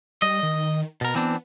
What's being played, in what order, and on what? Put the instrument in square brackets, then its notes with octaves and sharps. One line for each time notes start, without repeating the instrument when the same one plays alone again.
[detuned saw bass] G3 [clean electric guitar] D#5
[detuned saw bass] D#3
[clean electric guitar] B2 A#4 [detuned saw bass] B3
[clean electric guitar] E3 C4 D4